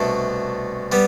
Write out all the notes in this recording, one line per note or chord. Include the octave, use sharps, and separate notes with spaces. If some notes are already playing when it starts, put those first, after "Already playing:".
Already playing: C2 B2 A3 D4 A4
G3 B3